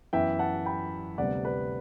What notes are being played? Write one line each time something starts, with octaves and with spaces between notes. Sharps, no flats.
F#2 E3 B3 E5 G5
F#5 A5
G5 B5
D2 C3 G3 B3 D5 F#5
B4 D5